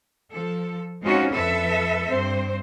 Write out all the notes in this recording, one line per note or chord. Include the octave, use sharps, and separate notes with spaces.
F3 A4
G#3 C4 C#4 D#4 F4 F#4
F2 A4 B4 E5
G2 C4 C5